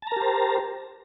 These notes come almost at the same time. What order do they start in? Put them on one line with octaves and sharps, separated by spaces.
A5 A#5 A#4 G4 C5